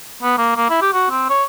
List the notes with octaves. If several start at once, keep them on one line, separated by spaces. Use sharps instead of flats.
B3
A#3
A#3
E4
G4
F#4
C4
C#5